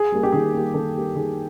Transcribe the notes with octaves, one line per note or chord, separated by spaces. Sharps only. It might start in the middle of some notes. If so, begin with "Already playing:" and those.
Already playing: G#4
G3 A#3
G4
D#3 G#4
G3 A#3
D#3 A4
G3 A#3
D#3 G#4